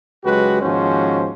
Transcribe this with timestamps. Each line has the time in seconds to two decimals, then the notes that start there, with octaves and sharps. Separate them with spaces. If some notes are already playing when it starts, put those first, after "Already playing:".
0.24 C#2 F#3 G#3 F#4 G4 B4
0.62 D#2 G#2 F3 C#4 F#4 C5